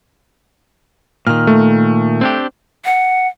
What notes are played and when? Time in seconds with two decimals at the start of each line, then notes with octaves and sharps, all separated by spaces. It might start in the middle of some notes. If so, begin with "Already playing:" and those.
1.27 A#2 D#3 F6
1.47 A3
2.21 C4 D4 G4
2.85 F#5